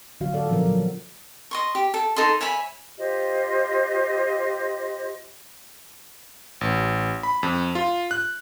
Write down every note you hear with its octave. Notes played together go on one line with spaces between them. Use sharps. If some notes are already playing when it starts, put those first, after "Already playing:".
D3 F#3 F#4 F5
F4 A4 D5 F5
A#2 F3 F#3 B3 D4 A#4
F#3
D#5 C6 C#6
G4
A4
D#4 A4 D#5 C6
C#5 E5 G#5 B5
F4 G4 C5 D#5
A1
B5
F2
F4
F#6